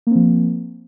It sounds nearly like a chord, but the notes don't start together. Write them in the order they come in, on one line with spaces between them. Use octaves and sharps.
A#3 C4 F3